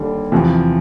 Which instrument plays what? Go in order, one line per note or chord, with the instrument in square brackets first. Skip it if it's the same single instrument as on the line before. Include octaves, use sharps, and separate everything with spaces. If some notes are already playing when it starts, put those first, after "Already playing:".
Already playing: [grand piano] D#2 D3 G3
E2 C3 F3